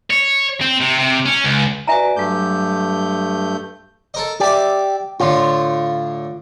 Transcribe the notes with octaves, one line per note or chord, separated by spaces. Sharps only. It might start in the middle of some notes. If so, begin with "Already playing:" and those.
C#5
C4
C3
C3
C#4
C#2
F#4 B4 D5 E5 G#5 A#5
G2 F#3 A3 D6 G6
A4 A#4 D#5
G4 D5 E5
A2 D3 F4